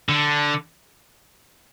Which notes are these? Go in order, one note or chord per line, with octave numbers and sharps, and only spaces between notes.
D3